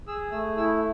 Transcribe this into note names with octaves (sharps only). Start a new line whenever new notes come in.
G#4 E6
A3 E6
E4 E6